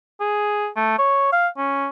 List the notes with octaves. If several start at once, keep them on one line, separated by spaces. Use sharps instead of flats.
G#4
A3
C#5
F5
C#4